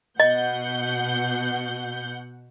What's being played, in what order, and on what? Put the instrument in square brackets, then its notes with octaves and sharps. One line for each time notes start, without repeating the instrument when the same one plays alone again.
[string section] B2 F#5 G6 [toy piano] D#5